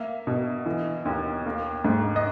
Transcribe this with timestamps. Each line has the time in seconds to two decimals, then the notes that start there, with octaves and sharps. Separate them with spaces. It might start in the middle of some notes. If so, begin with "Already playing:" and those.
Already playing: A#3 E5
0.27 B2
0.66 E3
1.05 D#2
1.46 A#3
1.85 G#2
2.16 D#5